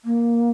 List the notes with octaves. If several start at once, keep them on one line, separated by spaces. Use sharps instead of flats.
A#3